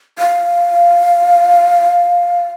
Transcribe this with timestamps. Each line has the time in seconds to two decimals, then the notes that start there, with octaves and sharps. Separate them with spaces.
0.19 F5